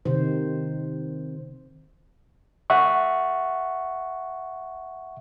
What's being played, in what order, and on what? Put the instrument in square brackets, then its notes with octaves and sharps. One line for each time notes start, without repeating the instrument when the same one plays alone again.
[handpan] C3 D#3 C5
[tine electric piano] E5 F#5 C#6